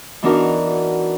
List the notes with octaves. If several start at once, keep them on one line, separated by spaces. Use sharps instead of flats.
E3 B3 D4 D#4 F#4 A#4